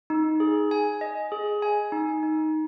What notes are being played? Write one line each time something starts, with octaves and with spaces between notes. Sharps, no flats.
D#4
G#4
G#5
D#5
G#4
G#5
D#4
D#4